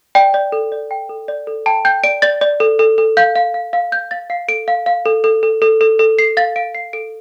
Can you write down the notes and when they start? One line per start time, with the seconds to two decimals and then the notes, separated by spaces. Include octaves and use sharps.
0.15 D5 G5
0.34 D5
0.52 A4
0.72 D5
0.91 G5
1.09 A4
1.28 D5
1.47 A4
1.66 G5 A5
1.85 G5 G6
2.04 D5 D7
2.22 D5 A6
2.41 D5
2.60 A4
2.79 A4
2.98 A4
3.17 F5 G6
3.36 F5
3.54 F5
3.73 F5
3.92 F5 G6
4.11 F5 A6
4.30 F5 C7
4.48 A4 D7
4.68 F5
4.86 F5
5.06 A4
5.24 A4
5.43 A4
5.62 A4
5.81 A4
5.99 A4
6.18 A4 C7
6.37 F5 A6
6.56 F5 D7
6.75 F5 C7
6.93 A4 D7